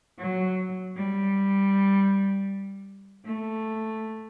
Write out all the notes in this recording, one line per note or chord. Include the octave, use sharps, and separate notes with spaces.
F#3
G3
A3